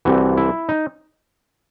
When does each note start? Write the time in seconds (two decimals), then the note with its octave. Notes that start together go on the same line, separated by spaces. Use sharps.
0.05 C2 C3 E3 F#4
0.37 E4
0.69 D#4